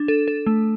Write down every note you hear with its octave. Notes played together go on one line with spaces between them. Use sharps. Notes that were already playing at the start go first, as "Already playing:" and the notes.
Already playing: D4
A4
A4
A3